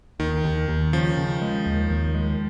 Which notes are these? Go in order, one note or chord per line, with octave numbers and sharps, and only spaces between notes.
D#2 D#3
D#2
D#2
C#3 F3
C#3
G#3
D#2
D#2
G#3